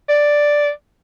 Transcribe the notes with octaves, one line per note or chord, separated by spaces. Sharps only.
D5